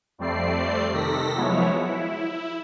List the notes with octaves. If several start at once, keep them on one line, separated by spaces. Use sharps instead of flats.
F2 G3 A3 C4 D5 C7
C3 D#3 A4 A#6 B6
F3 F#3 G#3 B3 E4 C#5
E4